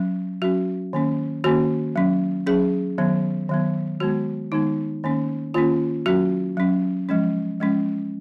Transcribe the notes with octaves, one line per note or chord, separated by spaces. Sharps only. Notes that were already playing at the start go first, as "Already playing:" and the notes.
Already playing: F#3 C#4
F#3 C#4 F#4
D#3 A#3 C#4
D#3 A#3 C#4 F#4
F#3 C#4
F#3 C#4 G#4
D#3 F#3 B3
D#3 F#3 B3
D#3 G#3 B3 F#4
D#3 G#3 B3 D#4
D#3 A#3 C#4
D#3 A#3 C#4 F4
F#3 C#4 F#4
F#3 C#4
F3 G#3 C#4
F3 G#3 C#4